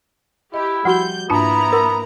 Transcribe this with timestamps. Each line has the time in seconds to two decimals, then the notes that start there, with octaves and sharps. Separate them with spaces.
0.54 E4 G4 D#5
0.85 F3 G3 F#4 F#5 G6
1.30 G#2 A#3 B3 D4 E4 F4 A#5
1.73 A#4 B4 F#5 C6